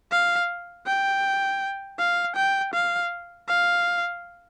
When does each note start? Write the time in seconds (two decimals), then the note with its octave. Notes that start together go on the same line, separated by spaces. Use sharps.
0.12 F5
0.87 G5
1.99 F5
2.36 G5
2.73 F5
3.48 F5